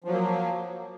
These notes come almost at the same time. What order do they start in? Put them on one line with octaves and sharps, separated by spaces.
F3 F#3 A#3